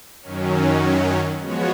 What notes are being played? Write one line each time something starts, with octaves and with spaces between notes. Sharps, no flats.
F#2 D#3 F#3 C#4
F3 G#3 B3 F#4 C#5